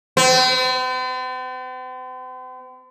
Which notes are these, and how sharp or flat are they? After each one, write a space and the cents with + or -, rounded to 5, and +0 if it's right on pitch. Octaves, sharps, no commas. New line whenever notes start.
C4 -45